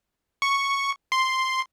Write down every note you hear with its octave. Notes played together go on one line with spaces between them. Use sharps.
C#6
C6